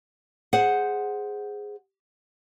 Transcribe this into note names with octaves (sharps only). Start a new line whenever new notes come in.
G#4 C5 F#5